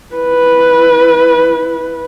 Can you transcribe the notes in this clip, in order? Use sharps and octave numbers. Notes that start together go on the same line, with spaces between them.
E4 B4